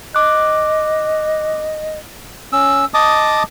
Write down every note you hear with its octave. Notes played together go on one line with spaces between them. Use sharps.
D#5 D6 F#6
C#4 E6
D#5 A5 D6 D#6